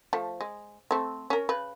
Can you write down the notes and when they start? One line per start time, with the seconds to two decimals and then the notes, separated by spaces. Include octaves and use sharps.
0.13 F3 A3
0.41 G#3
0.91 A3 C4
1.30 C#4 A#4
1.49 C#3 B4